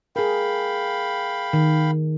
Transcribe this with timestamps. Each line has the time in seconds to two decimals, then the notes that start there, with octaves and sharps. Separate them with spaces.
0.16 G#4 A#4 F5 G5 B5
1.53 D#3